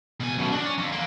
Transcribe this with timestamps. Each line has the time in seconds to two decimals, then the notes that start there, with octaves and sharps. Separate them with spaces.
0.20 B2 G#5
0.38 F#2 B2
0.52 D4 D#4
0.64 C#4
0.78 F2
0.92 D3 A#3